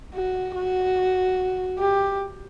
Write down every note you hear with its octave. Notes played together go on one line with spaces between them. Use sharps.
F#4
F#4
G4